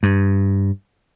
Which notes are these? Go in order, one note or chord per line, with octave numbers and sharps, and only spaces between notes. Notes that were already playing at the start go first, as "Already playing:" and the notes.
G2